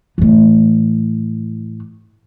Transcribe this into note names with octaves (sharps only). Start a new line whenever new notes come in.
A2 E3